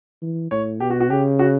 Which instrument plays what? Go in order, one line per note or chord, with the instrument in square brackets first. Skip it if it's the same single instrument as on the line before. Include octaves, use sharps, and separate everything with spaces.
[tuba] E3
[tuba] A2 [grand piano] C#5
[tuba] B2 [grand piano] G4
[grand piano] F#4
F#4
[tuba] C#3 [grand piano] G4
[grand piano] F#4